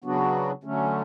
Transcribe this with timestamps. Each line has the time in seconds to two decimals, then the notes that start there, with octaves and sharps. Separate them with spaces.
0.04 C#3 F#3 B3 D4 F#4
0.64 D3 F#3 A3 C#4